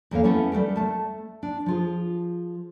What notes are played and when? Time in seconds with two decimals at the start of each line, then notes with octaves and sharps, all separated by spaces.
0.11 E2 A#3 A4 C#5 F5
0.24 A3 B3 C#4 E4
0.52 G3 A3 A4 A#4
0.76 A3 A5
1.43 D4
1.66 F3 F4 G#4